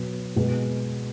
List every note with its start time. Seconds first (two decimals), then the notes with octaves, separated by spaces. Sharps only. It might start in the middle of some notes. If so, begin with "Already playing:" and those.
Already playing: B2 F#3 B3
0.36 B2 G#3 B3